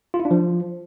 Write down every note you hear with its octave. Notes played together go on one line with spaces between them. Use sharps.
F4
E4
D4
F3